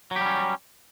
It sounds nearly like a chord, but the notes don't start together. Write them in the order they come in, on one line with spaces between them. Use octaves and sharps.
F#3 G4 G3 C#4